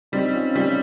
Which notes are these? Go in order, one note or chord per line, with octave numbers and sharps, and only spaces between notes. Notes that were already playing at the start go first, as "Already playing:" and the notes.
G3 C4 D#4
C#4 F4
G3 C#4 F4